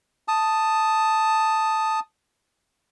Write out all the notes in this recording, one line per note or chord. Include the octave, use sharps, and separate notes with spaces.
A5 D#6